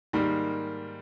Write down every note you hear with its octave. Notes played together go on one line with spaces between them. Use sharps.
G#2 D#3 G3 A#3